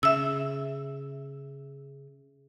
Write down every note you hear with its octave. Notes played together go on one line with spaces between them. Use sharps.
C#3 E5 E6